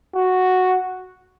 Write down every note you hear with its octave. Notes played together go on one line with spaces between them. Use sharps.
F#4